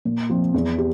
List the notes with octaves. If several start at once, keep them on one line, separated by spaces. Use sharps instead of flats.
A#2
F3 C4
E2
G4